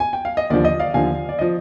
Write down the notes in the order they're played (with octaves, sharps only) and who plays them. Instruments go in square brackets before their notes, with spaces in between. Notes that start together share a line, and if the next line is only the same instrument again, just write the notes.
[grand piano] G#5
G5
F5
D#5
D#2 D3 F3 D5
D#5
D5 F5
D#2 D3 F3 F5 G#5
D5
F3 D#5